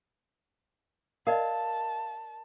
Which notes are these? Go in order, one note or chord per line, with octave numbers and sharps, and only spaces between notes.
A#4 D5 D#5 F5 A5